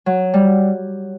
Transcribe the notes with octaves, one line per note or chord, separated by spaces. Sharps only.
F#3
G3